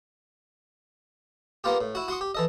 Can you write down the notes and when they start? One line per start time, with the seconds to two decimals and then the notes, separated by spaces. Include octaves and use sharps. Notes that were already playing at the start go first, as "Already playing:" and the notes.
1.64 A#3 B3 F4 G4
1.81 A2
1.95 E4 F#4
2.08 F#4 C6 C#6 D#6
2.21 G4
2.35 E3 A4 D#5